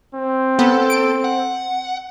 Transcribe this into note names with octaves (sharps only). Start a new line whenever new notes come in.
C4
B3 A4
D7
F#5